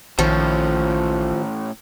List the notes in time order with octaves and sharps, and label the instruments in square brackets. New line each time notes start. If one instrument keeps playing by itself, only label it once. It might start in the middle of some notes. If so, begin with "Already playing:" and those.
[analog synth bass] A#1 [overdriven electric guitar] A2 C#4 [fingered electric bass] D#3 [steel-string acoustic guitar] F3